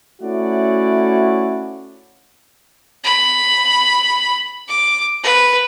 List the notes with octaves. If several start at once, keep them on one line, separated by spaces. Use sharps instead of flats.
A3 C#4 E4 F#4 D5 F#5
B5
D6
B4